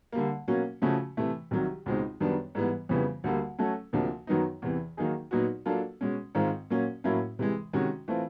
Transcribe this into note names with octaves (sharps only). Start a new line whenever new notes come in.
D3 G3 A#3
B2 F#3 A#3 C#4 F#4
C#3 F3 A3 C#4 F#4
C3 E3 A3
C2 C3 D#3 F#3
C#2 B2 G#3 C4 D#4
F#2 D#3 G3 B3 D4
G#2 E3 G3 B3
F2 C#3 E3 G3 B3
D2 D3 G3 A#3
F#3 A3 C#4 F#4 A4
D2 C3 F3 A#3 D4
F#2 D#3 F#3 B3 D#4
E2 C3 E3
D#3 F#3 A#3 D#4 G#4
A#2 F#3 B3 D#4 F#4
F#3 A#3 D4 F4 A4
B2 G#3 C#4
G#2 D#3 G#3 C4 F4
A#2 F#3 A#3 C#4
A2 F#3 A#3 C#4 E4
C3 E3 G#3
C3 D#3 G#3 C#4 F#4
E3 A3 C4 F4